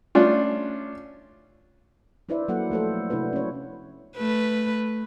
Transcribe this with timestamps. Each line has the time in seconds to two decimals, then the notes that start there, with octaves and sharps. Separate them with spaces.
0.15 A3 C#4 D4 F4
2.29 D4 E4 B4 C5 D5 E5
2.48 F#3 A#3 F#4 A4 F#5
2.70 F3 A3 A4 C5
3.10 C3 D4 E4 F#4 B4
3.33 C#4 C#5
4.17 A3 B4